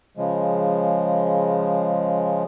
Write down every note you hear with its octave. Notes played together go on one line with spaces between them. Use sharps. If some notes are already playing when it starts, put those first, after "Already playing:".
C#3 F3 G#3